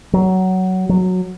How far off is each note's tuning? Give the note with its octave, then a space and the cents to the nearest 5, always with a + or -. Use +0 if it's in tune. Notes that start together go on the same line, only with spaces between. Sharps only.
F#3 +15
F#3 -10